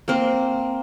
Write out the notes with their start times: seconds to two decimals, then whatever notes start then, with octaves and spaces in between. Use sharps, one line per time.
0.08 A#3 C4